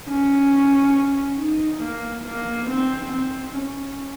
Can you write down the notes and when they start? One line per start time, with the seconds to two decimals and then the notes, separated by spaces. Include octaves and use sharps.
0.09 C#4
1.39 D#4
1.82 A#3
2.26 A#3
2.69 C4
3.12 C4
3.56 C#4